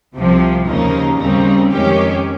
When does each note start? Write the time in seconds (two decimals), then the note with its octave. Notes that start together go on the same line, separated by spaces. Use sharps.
0.14 C2 C3 F3
0.66 D#2 C#3 F3 A#3 D#4
1.19 D#2 C#3 G3 C4 D#4
1.71 F2 D#3 G#3 C#4 G4